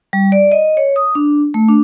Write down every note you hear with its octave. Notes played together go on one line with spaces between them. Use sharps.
G3
D5
D#5
C#5
D#6
D4
A3
D4